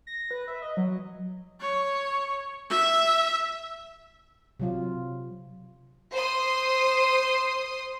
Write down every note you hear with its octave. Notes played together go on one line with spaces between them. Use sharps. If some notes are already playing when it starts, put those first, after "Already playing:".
A#6
B4
E5
D#5
F#3
C#5
E5
C3 F#3 F4
C5 C6 D#6